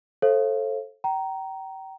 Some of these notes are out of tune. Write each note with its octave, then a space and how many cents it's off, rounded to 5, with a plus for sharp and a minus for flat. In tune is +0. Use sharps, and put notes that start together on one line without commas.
A4 +0 C5 +35 F5 -35
G5 -30 A#5 +0